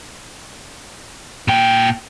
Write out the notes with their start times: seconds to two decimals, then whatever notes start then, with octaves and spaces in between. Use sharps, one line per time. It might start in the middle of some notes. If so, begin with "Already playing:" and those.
1.48 A#2 G5